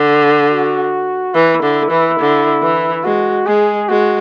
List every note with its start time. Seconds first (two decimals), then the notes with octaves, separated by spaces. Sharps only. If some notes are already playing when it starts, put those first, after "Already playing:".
Already playing: D3
0.50 F#4
1.34 E3 E4
1.63 D3
1.91 E3
2.19 D3
2.62 E3
3.04 G#3 F#4
3.46 G#3 G#4
3.89 G#3 F#4